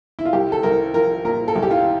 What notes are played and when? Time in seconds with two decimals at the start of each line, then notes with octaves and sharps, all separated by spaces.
0.19 E4
0.25 F4
0.33 C2 G4
0.52 A4
0.63 C2 A#4
0.94 F3 A#4
1.25 A#2 A#4
1.48 A4
1.55 C2
1.63 G4
1.71 F4